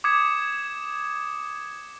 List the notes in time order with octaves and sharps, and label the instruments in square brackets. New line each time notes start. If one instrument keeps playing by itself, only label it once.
[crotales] D6 D#6 G#6 C#7 E7